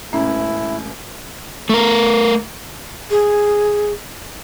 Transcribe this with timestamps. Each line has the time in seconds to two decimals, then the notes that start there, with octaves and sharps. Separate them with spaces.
0.13 E1 A1 C#4 E4
1.69 A3 A#4
3.10 G#4